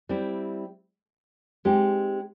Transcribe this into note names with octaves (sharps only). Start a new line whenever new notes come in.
G3 C4 E4
G#3 C4 D#4 G4